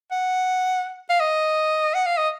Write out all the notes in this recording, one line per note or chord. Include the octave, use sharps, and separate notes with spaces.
F#5
F5
D#5
F#5
F5
D#5